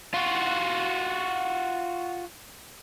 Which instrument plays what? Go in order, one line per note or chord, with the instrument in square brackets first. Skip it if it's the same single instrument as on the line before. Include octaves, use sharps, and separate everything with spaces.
[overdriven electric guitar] F4 F#4